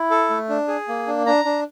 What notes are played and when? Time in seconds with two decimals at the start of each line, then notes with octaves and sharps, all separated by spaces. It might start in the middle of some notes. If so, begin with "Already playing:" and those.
Already playing: E4
0.11 A4
0.30 A3
0.49 D4
0.68 G#4
0.88 A#3
1.07 D4
1.26 D4 A#5
1.45 D4